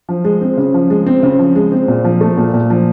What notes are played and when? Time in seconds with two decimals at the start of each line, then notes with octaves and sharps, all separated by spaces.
0.09 F3
0.24 G#3
0.41 C4
0.57 C#3
0.74 F3
0.90 G#3
1.06 C4
1.23 C#3
1.39 F3
1.55 G#3
1.72 C4
1.88 A#2
2.04 F3
2.21 A3
2.37 A#2
2.54 A#2
2.70 F3